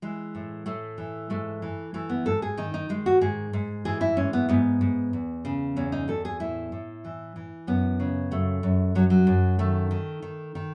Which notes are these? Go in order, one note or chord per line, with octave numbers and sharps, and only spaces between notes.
E3 G#3
A2
A2 A3
E3
G#2 A3
E3
E3 A3
B3
G#2 A4
G#4
D#3 D#4
D#4
D#3 G#3
F#4
G#2 G#4
G#2
E3 G#4
E4
G#2 C#4
B3
G#2 B3
G#2
E2
C#3
E2 C#4
D#4
E2 A4
G#4
A2 E4
A2
E3
E3
F#2 B3
C#3
F#2 A3
F#2
F#2 F#3
F#3
F#2
D#3 A3
D#3
D#3
D#3